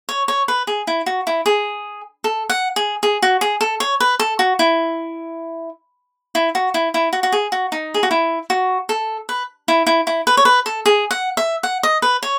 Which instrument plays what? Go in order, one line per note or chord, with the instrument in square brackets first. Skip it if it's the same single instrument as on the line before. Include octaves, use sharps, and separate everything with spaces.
[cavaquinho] C#5
C#5
B4
G#4
E4
F#4
E4
G#4
A4
F#5
G#4
G#4
F#4
G#4
A4
C#5
B4
A4
F#4
E4
E4
F#4
E4
E4
F#4
F#4
G#4
F#4
D#4
G#4
F#4
E4
F#4
A4
B4
E4
E4
E4
B4
C#5
B4
A4
G#4
F#5
E5
F#5
D#5
B4
C#5